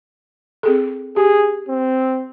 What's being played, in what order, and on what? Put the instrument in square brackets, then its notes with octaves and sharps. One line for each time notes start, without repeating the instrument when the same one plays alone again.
[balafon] C4 G#4 A4
[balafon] G4 [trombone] G#4
[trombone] C4